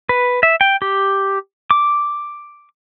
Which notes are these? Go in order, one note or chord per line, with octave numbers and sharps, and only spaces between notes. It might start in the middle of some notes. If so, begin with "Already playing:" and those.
B4
E5
G5
G4
D6